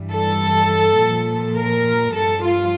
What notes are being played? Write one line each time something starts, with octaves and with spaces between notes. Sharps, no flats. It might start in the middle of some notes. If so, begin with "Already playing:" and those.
Already playing: G2 E3 G3
A4
A#2 F3
A#4
G2 F3 A4
F4